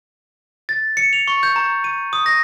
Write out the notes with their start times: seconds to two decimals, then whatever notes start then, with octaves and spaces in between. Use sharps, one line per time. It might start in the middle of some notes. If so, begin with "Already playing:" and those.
0.69 A6
0.97 C#7
1.13 F7
1.28 C#6
1.43 G6
1.56 A#5
1.84 D#7
2.13 D#6
2.26 A#6